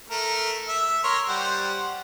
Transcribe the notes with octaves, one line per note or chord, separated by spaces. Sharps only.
A3 A#4
E5
A#4 C#5 C6
G3 C5 F#5